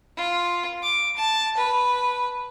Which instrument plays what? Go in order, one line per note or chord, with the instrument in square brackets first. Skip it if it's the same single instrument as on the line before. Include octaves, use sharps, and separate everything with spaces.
[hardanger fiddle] F4
D6
A5
B4